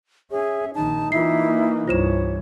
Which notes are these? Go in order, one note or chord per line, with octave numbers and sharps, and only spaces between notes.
C#4 G#4 E5
A#1 D#3 D#4 A5
E3 A#3 E4 F4 C7
C2 G2 E3 F4 C5 C#5 E7